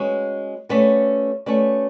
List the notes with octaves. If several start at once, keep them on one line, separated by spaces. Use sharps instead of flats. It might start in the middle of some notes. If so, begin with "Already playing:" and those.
Already playing: G#3 C#4 F#4 B4
A3 C#4 F#4 B4 D5
A3 C#4 F#4 B4 D5